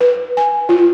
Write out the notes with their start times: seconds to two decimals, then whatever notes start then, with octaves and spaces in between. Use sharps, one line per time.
0.01 B4
0.37 G#5
0.69 F4